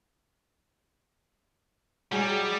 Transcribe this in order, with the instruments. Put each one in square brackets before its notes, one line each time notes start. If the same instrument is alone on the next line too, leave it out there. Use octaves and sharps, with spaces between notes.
[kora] F#3 G#4 D#5 [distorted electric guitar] G3